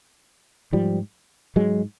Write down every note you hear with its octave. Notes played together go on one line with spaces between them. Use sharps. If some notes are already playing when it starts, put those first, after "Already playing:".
G#2 F3 G3
G#2 F#3 G#3